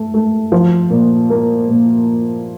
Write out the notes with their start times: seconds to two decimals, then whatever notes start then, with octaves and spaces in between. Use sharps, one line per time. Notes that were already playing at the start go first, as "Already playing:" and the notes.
Already playing: A3
0.14 A3
0.52 F3
0.90 A#2
1.30 A#3
1.69 A#2